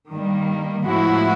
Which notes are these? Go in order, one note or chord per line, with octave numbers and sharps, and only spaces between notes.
G2 D#3 G3 A#3
A2 F3 G#3 B3 E4 F#4